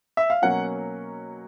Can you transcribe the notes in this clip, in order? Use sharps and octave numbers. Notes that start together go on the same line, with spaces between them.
E5
F5
B2 F#3 A#3 C#4 F#5